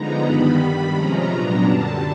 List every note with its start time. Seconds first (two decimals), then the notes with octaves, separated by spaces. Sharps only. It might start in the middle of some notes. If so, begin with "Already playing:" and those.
Already playing: D3 F3 G#3 B3 D#4 A#5
0.24 G2 D#3 G3 B3 B5
0.59 G2 D#3 G3
0.93 C3 F3 G#3 C#4 F4 A#5
1.28 A#2 F#3 B3 D4
1.63 F#2 D3 G3 A5